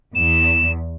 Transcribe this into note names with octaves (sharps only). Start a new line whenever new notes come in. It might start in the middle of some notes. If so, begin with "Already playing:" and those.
E2 E7